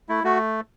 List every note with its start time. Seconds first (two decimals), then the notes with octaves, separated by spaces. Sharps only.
0.09 A3 E4
0.24 A3 F#4